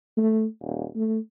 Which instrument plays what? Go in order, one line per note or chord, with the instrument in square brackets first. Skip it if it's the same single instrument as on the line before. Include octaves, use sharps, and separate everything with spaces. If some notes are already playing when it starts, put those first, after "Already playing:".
[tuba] A3
D#1
A3